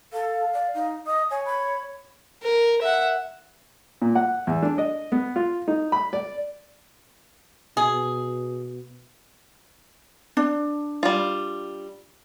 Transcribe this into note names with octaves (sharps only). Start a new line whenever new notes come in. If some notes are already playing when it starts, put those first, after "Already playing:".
A4 F5
D5
D#4
D#5 D#6
C#5 G#5
B5
A#4
E5 F#5
A#2
F#5
E2
D4
D#5
B3
F4
D#4
B5
D5
B2 G#4
D4
G3 F4